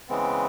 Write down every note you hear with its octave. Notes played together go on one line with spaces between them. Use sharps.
C#3 E3 G#3 B3 C4